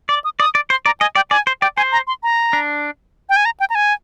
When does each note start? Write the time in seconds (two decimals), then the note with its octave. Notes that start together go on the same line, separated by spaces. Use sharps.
0.09 D5 D6
0.24 D#6
0.39 D5 D#6
0.55 D5
0.70 C5 C6
0.86 D5 A#5
1.00 D#5 G#5
1.15 D5 G5
1.31 D5 G#5
1.47 C5
1.61 D5 G5
1.77 C5 G#5
1.92 A#5
2.07 C6
2.23 A#5
2.53 D4
3.29 G5
3.36 G#5
3.45 A#5
3.60 G5
3.70 A#5
3.75 G#5